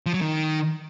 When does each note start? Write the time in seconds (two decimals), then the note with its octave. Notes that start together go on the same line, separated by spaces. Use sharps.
0.06 F3
0.14 F#3
0.21 D#3